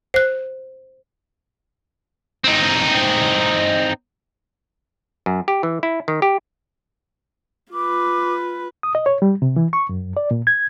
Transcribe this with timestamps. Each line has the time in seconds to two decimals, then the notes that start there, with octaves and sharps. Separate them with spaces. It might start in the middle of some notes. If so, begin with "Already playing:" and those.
0.14 C5 F#6
2.44 C4 D#4
5.26 F#2
5.48 G4
5.63 E3
5.83 E4
6.08 D#3
6.22 G4
7.73 F4 B4 D6
8.83 D#6
8.95 D#5
9.06 C#5
9.22 G3
9.42 C3
9.56 E3
9.73 C#6
9.89 F#2
10.17 D5
10.31 A#2
10.47 G#6